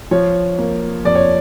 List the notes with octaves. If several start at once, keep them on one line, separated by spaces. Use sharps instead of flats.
F3 C#5
A#3
F2 D5
C#5